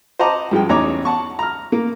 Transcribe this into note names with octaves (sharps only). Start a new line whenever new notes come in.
C5 D#5 F#5 A5 A#5 D6
G2 F3 G#3 G5
A1 E2 D#4 C#5 A#5 D6
F#5 A5 C#6
A#5 F6
A#3